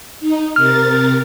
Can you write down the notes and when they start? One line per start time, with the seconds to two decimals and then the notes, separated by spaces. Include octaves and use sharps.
0.21 D#4
0.56 C3 A#4 F6 A6